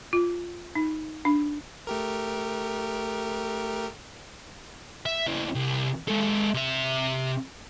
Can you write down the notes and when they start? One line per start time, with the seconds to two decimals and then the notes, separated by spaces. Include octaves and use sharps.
0.13 F4
0.75 D#4
1.25 D4
1.87 A3 G4 A#4
5.06 E5
5.26 C#3 E4
5.55 C2
6.08 G#3 A4
6.54 C3 E5